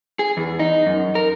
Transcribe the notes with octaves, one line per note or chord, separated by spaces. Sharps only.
G#4
E2
D#4
F#2
A#4